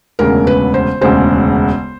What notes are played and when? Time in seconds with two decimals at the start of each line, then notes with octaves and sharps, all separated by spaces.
0.19 E1 D2 C#3 A#4
0.47 B4
0.74 C5
1.01 E1 D2 C#3 C5